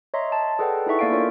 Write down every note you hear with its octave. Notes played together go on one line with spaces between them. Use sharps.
C#5 D#5 E5 A#5 C6
A5
G#4 A4 B4 D5 F#5 G5
D#4 E4 A4 E5 C#6
A#3 B3 D5 F5 G#5 D7
D4 F4 A#4 C#5 D5